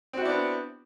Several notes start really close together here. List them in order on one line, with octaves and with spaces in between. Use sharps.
C4 F#4 E4 D4 B3